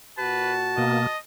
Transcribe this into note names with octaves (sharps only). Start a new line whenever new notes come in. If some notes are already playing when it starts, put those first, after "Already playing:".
A#2 F#4 B4 A5
B2 A#3 D#5